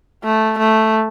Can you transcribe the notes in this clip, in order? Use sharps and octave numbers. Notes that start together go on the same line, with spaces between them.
A3
A3